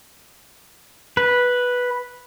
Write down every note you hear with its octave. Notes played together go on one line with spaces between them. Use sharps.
B4